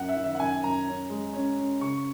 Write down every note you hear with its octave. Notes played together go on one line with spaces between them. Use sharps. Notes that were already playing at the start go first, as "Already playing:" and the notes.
Already playing: F#2 F#5
E5
D#3
E5
F#5
F#2 G#5
F#2 A#5
C#4
G#3
C#4
C#4
C#3 C#6